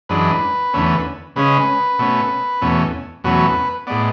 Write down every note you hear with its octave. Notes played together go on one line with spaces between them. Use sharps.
F#2 E3 G#3 D4 B4
E2 D3 A3 C#4
C#3 G#3 C#4 B4
B2 A3 C#4
E2 B2 A3 C#4
E2 B2 F#3 A3 C#4 B4
A2 G#3 B3 D5